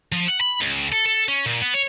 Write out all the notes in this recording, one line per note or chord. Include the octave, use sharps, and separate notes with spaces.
F3
F#5
B5
C#2
A4
A4
C#4
A#2
B3
C#5